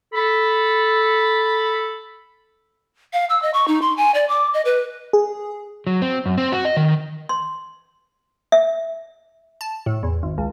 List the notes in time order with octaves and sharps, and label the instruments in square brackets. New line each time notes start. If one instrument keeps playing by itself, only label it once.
[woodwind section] A4 B5
[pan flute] F5
E6
D#5
C#6
D#4
C6
G#5
D5
D6
D#5
B4
[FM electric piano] G#4
[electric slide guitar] F#3
C4
F#2
C4
F#4
D#5
D#3
[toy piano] C6
E5
[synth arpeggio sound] A5
A2
E2
G#1
C#2